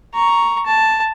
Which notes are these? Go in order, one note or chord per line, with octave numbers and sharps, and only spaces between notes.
A#5 C#6
A5